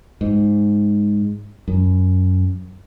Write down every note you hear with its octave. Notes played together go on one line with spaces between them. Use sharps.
G#2
F#2